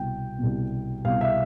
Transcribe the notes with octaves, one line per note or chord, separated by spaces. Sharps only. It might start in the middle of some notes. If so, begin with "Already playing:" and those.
Already playing: C2 B2 G5
C2 B2
C2 B2 F5
E5